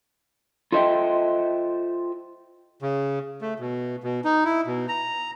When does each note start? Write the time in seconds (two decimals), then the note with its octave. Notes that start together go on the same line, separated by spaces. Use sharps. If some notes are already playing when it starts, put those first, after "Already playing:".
0.72 F4 A4 C5 D#5 E5 G5
2.82 C#3
3.41 A3
3.60 B2
4.04 B2
4.24 D#4
4.45 E4
4.66 B2
4.88 A#5